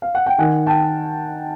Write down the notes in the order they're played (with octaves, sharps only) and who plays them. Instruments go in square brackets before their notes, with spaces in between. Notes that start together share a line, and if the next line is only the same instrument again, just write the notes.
[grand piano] F5
F#5
G5
D#3 F#5 G#5
G5 A5